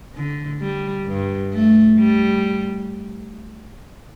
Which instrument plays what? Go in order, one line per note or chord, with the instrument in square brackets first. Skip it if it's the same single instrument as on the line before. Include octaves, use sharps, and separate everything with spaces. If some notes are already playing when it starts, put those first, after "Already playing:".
[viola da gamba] D3
G3
G2
A3
G3